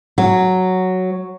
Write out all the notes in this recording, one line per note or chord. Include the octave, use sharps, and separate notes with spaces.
F#3